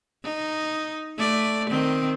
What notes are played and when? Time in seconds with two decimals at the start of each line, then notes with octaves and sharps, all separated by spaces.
0.24 D#4
1.17 A3 D5
1.69 D#3 C4